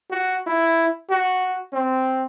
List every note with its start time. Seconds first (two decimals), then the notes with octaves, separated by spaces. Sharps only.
0.11 F#4
0.47 E4
1.10 F#4
1.73 C4